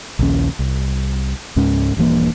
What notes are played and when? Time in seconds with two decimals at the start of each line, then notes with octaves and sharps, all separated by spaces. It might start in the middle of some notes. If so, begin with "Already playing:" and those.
0.19 A#1 D#2 C#4
0.59 C2
1.56 C#2 G#2 C#4
1.97 D#1 G2 E3 A#3